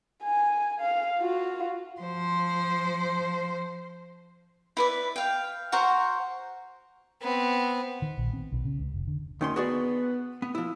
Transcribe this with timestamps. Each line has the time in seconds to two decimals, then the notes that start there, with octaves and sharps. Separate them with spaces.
0.23 G#5
0.80 F5
1.20 F4 F#4
2.01 F3 C5
4.77 E4 B4 D5
5.16 F5 G5
5.72 F#4 A#4 C5 F#5
7.21 B3 C4
8.02 D#3
8.17 A#1
8.33 C4
8.52 B1
8.65 C#3
8.80 C#2
8.94 F1
9.07 D3
9.41 D2 D#3 C#4 C6
9.56 B3 F#4 G#4 D5
10.42 B3
10.55 F3 E4